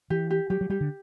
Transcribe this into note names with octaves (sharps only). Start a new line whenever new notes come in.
E3 G4
G4
F#3 G4
F#3
G3 G4
D3